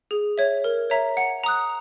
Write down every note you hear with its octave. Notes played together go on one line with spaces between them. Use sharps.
G#4
C#5 E5
A#4
C#5 E5 A#5
F#5
A#5 D#6 F#6